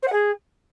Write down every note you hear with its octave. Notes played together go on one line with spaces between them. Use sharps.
C5
F#5
G#4